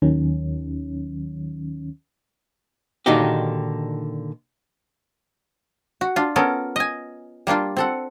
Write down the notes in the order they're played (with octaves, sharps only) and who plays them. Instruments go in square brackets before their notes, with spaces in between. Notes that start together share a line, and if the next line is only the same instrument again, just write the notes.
[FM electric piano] D#2 D#3 F#3 C#4
[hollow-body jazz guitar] A#2 D3 D#3 D#4 F#4 G4
[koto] F#4
D4 F4
B3 C#4 A4 A#4
D#5 G#5
G3 A#3 D4 F4
C4 A4 F#5